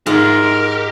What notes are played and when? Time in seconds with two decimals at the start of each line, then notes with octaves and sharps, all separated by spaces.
0.06 G#2 F4 A#4 E5
0.43 G4